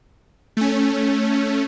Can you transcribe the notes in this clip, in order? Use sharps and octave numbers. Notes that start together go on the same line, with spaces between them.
A3 C#4